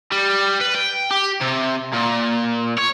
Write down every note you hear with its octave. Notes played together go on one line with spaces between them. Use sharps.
G3
B4
G5
G4
C3
A#2
C#5